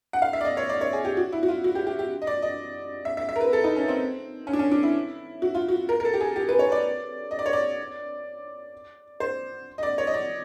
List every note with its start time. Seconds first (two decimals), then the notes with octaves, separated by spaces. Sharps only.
0.13 F#5
0.22 F5
0.33 E5
0.41 D5
0.45 D#5
0.57 C#5
0.70 D5
0.81 C#5
0.93 G#4
1.05 G4
1.17 F#4
1.32 E4
1.43 F#4
1.48 F4
1.64 F#4
1.75 G4
1.87 G4
1.99 G4
2.22 D#5
2.27 D5
2.42 D#5
3.05 E5
3.17 E5
3.29 E5
3.36 A#4
3.41 B4
3.53 A4
3.64 D#4
3.76 C#4
3.88 C4
4.47 C#4
4.53 D4
4.59 C#4
4.71 D4
4.83 E4
5.42 F#4
5.55 F4
5.69 F#4
5.89 A#4
6.00 A#4
6.05 A4
6.14 G4
6.21 G#4
6.36 G4
6.49 B4
6.59 C#5
6.72 D5
7.31 D#5
7.39 D5
7.46 C#5
7.53 D5
9.20 C5
9.78 D#5
9.83 D5
9.98 C#5
10.07 D#5
10.14 D5